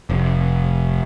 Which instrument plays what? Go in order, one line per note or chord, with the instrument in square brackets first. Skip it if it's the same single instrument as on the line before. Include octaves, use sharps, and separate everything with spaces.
[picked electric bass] F1